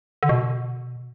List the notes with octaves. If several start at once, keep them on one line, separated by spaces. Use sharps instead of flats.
D3
B2